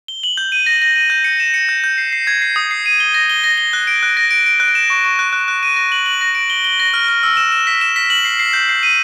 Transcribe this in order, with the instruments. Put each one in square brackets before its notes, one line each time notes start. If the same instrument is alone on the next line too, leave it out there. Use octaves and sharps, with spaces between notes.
[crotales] G7
F#7
G6
D#7
A#6
A#6
D#7
G6
C#7
E7
C#7
G6
G6
C7
C7
G#6
C7
D#6
C7
D#7
G7
A#6
G7
A#6
G7
F#6
D7
F#6
A#6
D7
D7
F#6
E7
C#6
C#6
F#6
F#6
F#6
D#7
A#6
F#7
F#7
A#6
D7
G7
G7
A#6
F6
F6
E6
E7
E7
B6
E7
B6
F#7
C7
C7
G6
C7
D#7